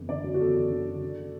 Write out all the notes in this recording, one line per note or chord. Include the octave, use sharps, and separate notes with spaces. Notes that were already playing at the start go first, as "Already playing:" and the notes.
Already playing: F#1 E2
D3 D5
F#3
F#4
E2 A4
F#1
D3
F#3
D3